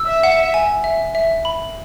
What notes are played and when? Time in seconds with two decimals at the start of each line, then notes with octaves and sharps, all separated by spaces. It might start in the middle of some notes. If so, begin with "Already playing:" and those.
Already playing: E6
0.08 E5
0.23 F#5
0.54 G#5
0.84 E5
1.15 E5
1.45 B5